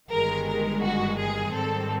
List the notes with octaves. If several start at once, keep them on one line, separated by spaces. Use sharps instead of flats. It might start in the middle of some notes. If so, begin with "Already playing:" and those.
G1 G2 D#3 G#3 A#4
A#4
F#4
G#4
G#2 D#3 G3 C4 A4